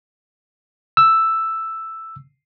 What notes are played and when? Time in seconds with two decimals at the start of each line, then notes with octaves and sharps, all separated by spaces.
0.97 E6